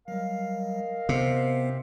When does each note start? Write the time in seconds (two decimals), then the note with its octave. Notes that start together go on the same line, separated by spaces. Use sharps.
0.08 F#3 G3 A#4 D#5 F5
1.09 C3 B3 C4 C5